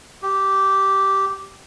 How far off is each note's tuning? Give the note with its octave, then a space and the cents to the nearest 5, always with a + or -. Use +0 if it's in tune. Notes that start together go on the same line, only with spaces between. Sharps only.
G4 -10